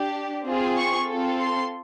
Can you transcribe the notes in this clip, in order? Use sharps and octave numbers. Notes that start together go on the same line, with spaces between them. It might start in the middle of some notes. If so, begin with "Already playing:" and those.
Already playing: D4 G4
C4 F4 G#4
C#6
C4 F4 A4
C6